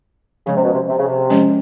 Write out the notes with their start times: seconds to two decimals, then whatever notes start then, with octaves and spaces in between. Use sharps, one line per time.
0.46 C#3 F3 G#3 C#4
0.56 C3
0.64 B2
0.72 C3
0.89 C3
0.98 C#3
1.07 C3
1.30 F3 G#3 C#4